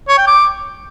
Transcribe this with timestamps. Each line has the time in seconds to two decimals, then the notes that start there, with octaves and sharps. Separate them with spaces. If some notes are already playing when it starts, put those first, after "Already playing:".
0.08 C#5
0.18 G5
0.27 D6